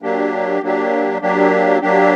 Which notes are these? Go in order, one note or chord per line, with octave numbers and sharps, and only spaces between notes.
F#3 A#3 D4 G4
F#3 A#3 D4 G4
F#3 A#3 D4 G4
F#3 A#3 D4 G4